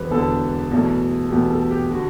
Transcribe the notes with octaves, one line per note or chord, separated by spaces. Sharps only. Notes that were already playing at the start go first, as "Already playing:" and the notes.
Already playing: E1 E2 D3 G4 B4 C5
E1 E2 D3 A4
E2 B2 A3
E2 B2 A3 G4
A4
G4
D3 F#4